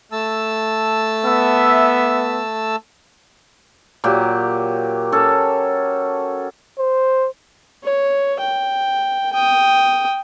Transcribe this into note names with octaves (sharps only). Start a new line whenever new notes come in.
A3 A5 E6
B3 E5
A#2 F#3 G4
C#4 A4
C5
C#5
G5
G5 D#6